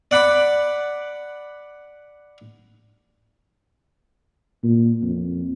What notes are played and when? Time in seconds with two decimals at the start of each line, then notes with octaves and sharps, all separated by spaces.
0.11 D5 F#5 B5 D6
4.64 A#2
5.02 F2